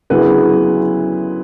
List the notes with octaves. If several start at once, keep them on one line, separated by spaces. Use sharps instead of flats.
D2 C#3 F#3 B3 E4 B4